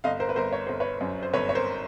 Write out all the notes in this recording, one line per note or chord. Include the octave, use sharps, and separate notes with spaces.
G1 D#5 F5
A#4 C5
B4
G1 A#4 C5
C#5
G1 C5
B4 C#5
F#2
C5
G1 B4 C#5
C#5
A#4 C5